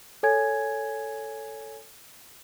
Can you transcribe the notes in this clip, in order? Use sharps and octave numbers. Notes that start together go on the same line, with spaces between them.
A4 C#5 G#5 G#6